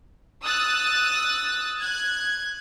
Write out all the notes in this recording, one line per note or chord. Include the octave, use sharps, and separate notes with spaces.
D#6 E6 F#6 A6
F#6 G#6